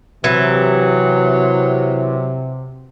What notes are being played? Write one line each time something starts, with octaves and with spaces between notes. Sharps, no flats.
C3 E3 F#3